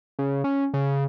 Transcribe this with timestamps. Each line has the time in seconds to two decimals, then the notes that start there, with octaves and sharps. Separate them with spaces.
0.19 C#3
0.44 C#4
0.74 C#3